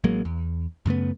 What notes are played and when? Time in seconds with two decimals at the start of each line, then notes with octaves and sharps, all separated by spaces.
0.04 A1 F#3 G#3 A#3
0.25 E2
0.86 F#2 C#3 A3 B3